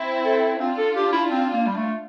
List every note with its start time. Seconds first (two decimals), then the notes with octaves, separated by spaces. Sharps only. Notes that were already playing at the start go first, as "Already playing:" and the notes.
Already playing: C4 E4
0.25 A4
0.59 C4 D4 F4
0.78 A4
0.95 G4
1.12 E4
1.30 C4
1.53 A#3
1.67 G3
1.77 A3